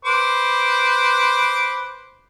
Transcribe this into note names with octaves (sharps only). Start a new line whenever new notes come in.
B4 C5 D6